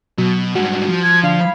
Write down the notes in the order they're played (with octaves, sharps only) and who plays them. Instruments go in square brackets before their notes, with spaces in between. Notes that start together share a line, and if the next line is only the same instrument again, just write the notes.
[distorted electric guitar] B2 [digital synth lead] F#3
[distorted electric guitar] G#2 G3 [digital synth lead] F#4
[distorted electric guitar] F3
[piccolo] G#6
[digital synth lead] D3 [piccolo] F5
[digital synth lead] B5